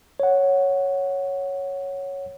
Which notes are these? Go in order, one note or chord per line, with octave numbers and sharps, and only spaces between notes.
C#5 F#5